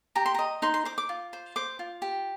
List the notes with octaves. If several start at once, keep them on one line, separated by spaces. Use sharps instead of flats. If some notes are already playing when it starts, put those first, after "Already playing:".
G4 A#5
C6
A#5
D#5
D#4 C6
C6
C5 D6
D6
F4
C5
C5 D6
F4
G4